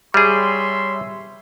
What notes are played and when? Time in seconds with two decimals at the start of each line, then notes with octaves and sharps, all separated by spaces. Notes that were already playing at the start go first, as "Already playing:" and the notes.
0.14 G3 G#4 C#5 E5 C6